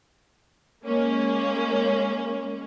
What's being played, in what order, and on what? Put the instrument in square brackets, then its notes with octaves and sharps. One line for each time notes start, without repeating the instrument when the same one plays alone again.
[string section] G#3 A#3 C#4